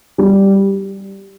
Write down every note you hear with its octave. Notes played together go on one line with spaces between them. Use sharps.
G3